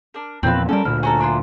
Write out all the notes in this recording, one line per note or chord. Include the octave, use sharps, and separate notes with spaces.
D4 A#4
E2 A#2 F3 C4 B4
G3 B3 C#4 A4 A#4
D2 A#2 E4 F6
C#4 F#4 A4 G#5 A#5
D4 E4 F4